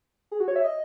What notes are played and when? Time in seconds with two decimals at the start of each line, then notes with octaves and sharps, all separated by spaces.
0.31 G#4
0.40 F#4
0.48 C#5
0.56 E5
0.64 D#5